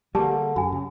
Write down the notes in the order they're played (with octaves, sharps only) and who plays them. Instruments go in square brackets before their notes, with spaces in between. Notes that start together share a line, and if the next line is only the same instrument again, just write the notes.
[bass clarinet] D3 [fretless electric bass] G3 A3 A#3 [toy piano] G4 G#4 A5
[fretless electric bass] F#2 [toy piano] F#4 G#5
[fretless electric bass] C#3